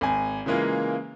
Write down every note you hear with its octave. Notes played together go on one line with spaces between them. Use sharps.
G#1 G#5
C#3 E3 G#3 A#3 F4